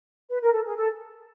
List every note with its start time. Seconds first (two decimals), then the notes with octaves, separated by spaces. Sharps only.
0.30 B4
0.41 A#4
0.53 A4
0.65 G#4
0.76 A4